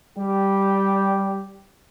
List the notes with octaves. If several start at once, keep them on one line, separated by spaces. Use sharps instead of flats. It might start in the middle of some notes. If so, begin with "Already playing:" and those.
G3 G4